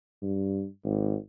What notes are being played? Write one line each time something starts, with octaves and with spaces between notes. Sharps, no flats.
G2
G#1